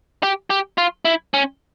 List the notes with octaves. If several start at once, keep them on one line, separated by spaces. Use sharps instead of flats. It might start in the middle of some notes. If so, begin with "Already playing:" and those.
G4
G4
F4
E4
C#4